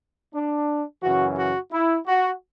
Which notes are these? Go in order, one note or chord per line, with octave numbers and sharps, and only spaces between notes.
D4
F#2 C#3 E3 F#4
F#4
E4
F#4